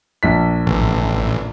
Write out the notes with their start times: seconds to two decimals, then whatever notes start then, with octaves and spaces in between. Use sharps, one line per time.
0.23 A#1 B6
0.66 A1